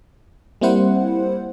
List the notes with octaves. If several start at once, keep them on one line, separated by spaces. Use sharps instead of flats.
G3 A#3 C4 E4 C5 F#5